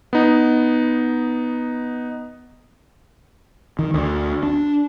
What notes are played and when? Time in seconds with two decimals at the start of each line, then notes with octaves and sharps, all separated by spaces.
0.13 B3 D#4
3.79 D#3
3.94 D2
4.43 D4